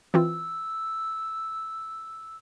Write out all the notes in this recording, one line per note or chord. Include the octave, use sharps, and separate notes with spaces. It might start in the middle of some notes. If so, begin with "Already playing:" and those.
E3 C4 F4 E6